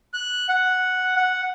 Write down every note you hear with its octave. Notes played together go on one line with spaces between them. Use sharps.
F#6
F#5
F#5